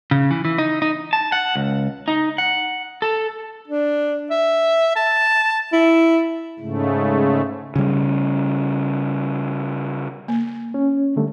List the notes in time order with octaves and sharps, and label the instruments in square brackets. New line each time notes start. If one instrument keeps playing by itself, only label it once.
[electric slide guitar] C#3
E3
E3
D#4
D#4
[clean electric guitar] A5
F#5
C#2
D#4
F#5
A4
[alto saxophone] D4
E5
A5
E4
[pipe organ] G#2 C#3 A3
[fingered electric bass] C#3 G3
[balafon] A#3
[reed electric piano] C#4
D3 G3 A3